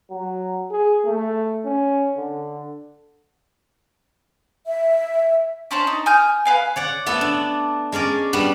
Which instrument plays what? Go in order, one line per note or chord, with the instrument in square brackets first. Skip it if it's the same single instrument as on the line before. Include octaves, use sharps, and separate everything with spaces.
[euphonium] F#3
G#4
A3
C#4
D3
[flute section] E5
[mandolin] C#4 D4 C5 C#5
D#4
G#5 D#6 F6 G6
B4 F5 G#5
[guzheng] C#5 D5 F#5
A3 B3 A4
D4
G#3 C#4 A#4 D5
G3 B3 D4